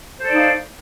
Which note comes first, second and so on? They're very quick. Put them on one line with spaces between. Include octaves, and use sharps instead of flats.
C5 A4 D5 D#4 F5